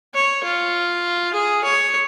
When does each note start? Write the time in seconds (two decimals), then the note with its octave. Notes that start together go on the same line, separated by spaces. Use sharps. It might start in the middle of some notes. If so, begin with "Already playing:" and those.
0.14 C#5
0.44 F4
1.33 G#4
1.64 C#5